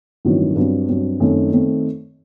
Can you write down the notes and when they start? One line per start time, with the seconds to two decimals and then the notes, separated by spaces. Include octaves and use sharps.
0.25 A1 G2 D#3 F#3 C4
0.56 G2 F#3 C4
0.88 G2 F#3 C4
1.20 F#2 D#3 A3 C4
1.53 D#3 A3 C4